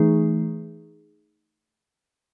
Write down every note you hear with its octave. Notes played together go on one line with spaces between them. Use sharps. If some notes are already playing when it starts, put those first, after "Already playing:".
Already playing: E3 A3 D#4 G#4